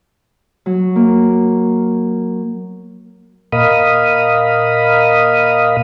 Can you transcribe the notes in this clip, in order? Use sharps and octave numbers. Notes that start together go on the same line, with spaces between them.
F#3
A#3
A#2 A#4 D#5 F5 B5 D#6